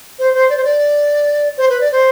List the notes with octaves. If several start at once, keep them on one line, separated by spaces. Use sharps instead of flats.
C5
C5
D5
C5
D5
C5
B4
D5
C5